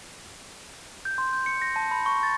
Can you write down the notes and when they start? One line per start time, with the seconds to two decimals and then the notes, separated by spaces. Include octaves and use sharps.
1.05 G6
1.18 C6
1.33 G6
1.46 C#7
1.62 A#6
1.76 A5
1.91 B5
2.06 C#6
2.23 A6